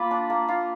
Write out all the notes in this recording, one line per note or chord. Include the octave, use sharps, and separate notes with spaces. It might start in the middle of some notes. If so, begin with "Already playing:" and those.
Already playing: A#3 F4 B5 D6
D4
A#3
F4